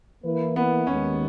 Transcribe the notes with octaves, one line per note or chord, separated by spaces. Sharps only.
E3 A#3 E4 B4
B3
D#2 D#3 G#3 C#4